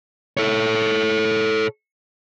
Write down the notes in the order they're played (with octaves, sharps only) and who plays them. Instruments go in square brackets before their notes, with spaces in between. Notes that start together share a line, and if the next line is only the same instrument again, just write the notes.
[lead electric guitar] A4 C#5